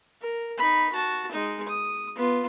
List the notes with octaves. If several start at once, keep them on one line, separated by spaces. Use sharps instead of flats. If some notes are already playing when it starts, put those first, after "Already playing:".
A#4
D#4 B5
F#4 A5
G#3 D#4
D#6
B3 F4